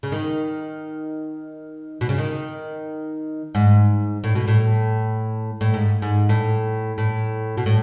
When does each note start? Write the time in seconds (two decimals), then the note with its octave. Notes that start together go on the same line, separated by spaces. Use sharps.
0.03 C#3
0.12 D#3
2.01 B2
2.09 C#3
2.18 D#3
3.55 G#2
4.24 A2
4.35 B2
4.48 A2
5.61 A2
5.74 G#2
6.02 G#2
6.29 A2
6.98 A2
7.57 B2
7.66 A2